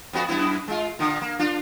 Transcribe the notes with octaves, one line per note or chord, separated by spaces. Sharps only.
F2 B3 F#4
F#2 B3 E4
G#3 F4
A#2 D3
A#3
D4 F4